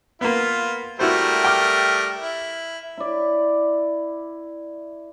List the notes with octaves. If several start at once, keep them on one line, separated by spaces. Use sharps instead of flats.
A#3 B3 F4
G3 A3 E4 F#4 A#4 C5
G5 D6 F6
E4
E4 D5